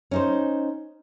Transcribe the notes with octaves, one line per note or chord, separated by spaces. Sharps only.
C#4 D#4 C5